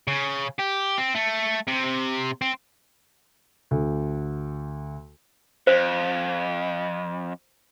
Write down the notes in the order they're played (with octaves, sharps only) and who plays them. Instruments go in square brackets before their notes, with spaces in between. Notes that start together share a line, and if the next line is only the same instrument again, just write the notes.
[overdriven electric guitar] C#3
G4
C4
A3
C3
C4
[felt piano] D2
[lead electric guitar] F2 [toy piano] C5